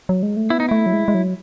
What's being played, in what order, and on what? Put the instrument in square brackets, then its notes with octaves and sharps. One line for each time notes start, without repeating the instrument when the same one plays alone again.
[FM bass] F#3
G#3
A3
[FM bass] B3 [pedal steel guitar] E4
[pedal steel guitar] D#4
[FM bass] A3 [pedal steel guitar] E4
[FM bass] F#3
G#3
G#3
F#3